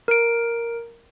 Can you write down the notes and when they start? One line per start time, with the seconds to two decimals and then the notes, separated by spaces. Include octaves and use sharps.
0.08 A#4 D7